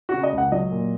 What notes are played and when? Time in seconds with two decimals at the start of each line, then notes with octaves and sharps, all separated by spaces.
0.09 C#3 F#4
0.23 D#5
0.33 C#2
0.38 F#5
0.52 F#3 D#5
0.71 A#2